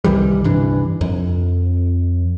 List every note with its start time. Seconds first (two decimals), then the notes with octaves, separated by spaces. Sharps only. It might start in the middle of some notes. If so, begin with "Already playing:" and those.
0.04 C2 D#3 E3 G3
0.44 G2 C3 E3 D4
1.01 F2